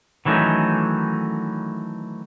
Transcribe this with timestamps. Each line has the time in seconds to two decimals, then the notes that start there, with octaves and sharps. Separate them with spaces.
0.25 D#3 E3 F#3 A3 C#4 D#4